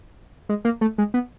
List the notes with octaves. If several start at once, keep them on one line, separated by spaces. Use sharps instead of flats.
G#3
A#3
A3
G#3
B3